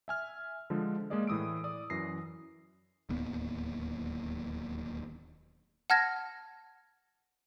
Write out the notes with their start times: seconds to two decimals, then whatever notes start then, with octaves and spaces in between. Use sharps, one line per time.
0.08 E5 G#5 F6
0.70 D3 F3 G#3
1.10 G#3 A#3 G#4 D5 D#5
1.27 A2 E3 D#6 E6 D7
1.64 D5 D#6
1.90 F#2 E3 A#6 C7
3.09 D1 D#2 B3
5.90 F#5 A5 F6 G#6 A#6